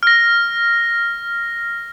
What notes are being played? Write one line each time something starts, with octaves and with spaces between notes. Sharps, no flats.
F6 A#6